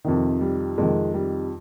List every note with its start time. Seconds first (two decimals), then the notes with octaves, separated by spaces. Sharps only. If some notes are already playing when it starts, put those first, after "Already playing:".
0.04 F2 C3 D#3
0.41 G3
0.78 F2 C3 D#3 G#3
1.14 G3